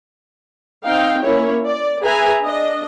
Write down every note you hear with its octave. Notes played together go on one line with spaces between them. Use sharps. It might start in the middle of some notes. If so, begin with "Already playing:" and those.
C4 D#4 F5 G5
A#3 C#4 E4 C#5
D5
G#4 B4 E5 G#5 A#5
D4 D#5